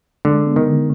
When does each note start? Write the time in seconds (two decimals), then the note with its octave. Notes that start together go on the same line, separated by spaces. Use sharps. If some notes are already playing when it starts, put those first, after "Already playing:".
0.25 D3 G#3
0.46 B3
0.56 D#3
0.66 D3